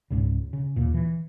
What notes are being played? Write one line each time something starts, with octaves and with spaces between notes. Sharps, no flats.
C#2 G#2 C#3
C#3
D#2 A#2
E3